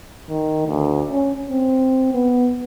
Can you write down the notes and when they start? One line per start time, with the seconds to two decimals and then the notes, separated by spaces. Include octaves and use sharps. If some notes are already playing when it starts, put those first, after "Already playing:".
0.30 D#3
0.67 D2
1.10 C#4
1.50 C4
2.14 B3